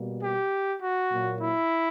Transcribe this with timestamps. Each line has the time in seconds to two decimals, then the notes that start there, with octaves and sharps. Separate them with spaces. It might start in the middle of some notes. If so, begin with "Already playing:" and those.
Already playing: B2 G3 A#3
0.22 G4
0.81 F#4
1.10 A#2 F#3 A#3
1.40 E4